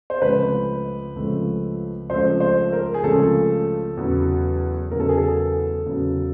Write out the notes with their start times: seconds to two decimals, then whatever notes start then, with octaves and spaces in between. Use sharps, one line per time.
0.10 C5
0.22 C#2 C#3 F3 A3 C4 B4
1.16 C#2 C#3 F3 A3 C4
2.10 C#2 C#3 F3 A3 C4 C5
2.40 C5
2.73 A#4
2.94 G#4
3.03 C#2 C#3 F3 A3 C4 A4
3.97 E2 C#3 F#3
4.91 E2 C#3 F#3 A#4
5.00 A4
5.09 G#4
5.17 A4
5.86 E2 C#3 F#3